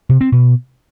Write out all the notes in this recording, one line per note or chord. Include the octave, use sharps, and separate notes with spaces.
C3
C4
B2